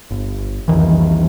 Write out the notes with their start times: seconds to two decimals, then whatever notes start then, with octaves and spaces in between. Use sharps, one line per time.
0.11 G1
0.68 C2 F2 D#3 E3